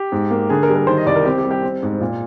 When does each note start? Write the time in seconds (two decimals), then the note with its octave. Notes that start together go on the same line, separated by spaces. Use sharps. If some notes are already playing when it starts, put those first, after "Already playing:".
Already playing: G4
0.12 G#2
0.31 A#3
0.50 D3 G#4
0.63 A#4
0.69 G3
0.75 A#4
0.87 D#3 C5
0.97 D#5
1.06 C2 D5
1.16 A#4
1.25 C4 G4
1.38 G4
1.44 G3
1.51 G4
1.63 C4
1.83 G#2
2.00 A#2